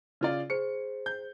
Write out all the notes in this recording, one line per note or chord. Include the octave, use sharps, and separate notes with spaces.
C#3 F4 D5
G#4 C5 C#7
G6